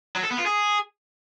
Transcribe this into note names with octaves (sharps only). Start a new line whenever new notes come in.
F#3
A4
B3
F4
G#4